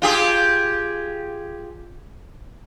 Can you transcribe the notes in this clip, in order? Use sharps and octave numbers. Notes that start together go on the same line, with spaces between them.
F4 G4 G#4